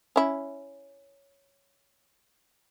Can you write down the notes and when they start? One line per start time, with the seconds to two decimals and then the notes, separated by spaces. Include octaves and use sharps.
0.16 C#4 E4